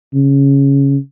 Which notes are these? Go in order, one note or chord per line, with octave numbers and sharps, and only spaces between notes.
C#3